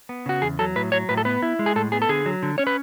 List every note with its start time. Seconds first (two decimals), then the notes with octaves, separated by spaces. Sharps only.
0.09 B3
0.26 C#3 F#4
0.42 E2 G#4
0.59 F#3 A4
0.76 A2 B4
0.92 F#3 C#5
1.09 A2 B4
1.17 A4
1.25 B3 B4
1.42 E4
1.59 G#3
1.66 G#4
1.76 A2 A4
1.92 B3 G#4
2.02 A4
2.09 D3 G#4
2.26 F#3
2.43 D3
2.58 C#4 C#5
2.67 B4